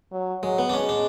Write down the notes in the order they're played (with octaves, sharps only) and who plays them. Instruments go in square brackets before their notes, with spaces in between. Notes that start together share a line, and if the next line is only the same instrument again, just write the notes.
[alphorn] F#3
[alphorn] F#3 [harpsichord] G#3
[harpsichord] B3
D4
[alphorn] G#3 [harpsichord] C#4
[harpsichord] D4